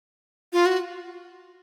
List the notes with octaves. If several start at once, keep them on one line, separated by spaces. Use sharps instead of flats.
F4
F#4